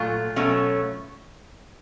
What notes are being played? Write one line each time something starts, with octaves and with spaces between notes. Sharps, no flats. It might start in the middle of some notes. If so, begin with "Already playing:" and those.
Already playing: A#2 F#3 A3 F4
B2 F#3 A3 C#4